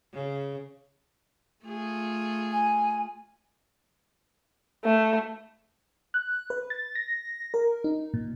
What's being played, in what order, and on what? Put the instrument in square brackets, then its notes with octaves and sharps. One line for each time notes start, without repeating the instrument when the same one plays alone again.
[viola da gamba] C#3
A3 F4 G#4
[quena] G#5
[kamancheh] A3
[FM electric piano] F#6
B4
A6
A#6
A#4
D#4
A#2